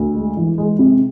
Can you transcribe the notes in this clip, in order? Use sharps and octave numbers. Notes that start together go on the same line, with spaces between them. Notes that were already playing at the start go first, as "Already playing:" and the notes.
Already playing: D2
G#3
E3
G#3
C3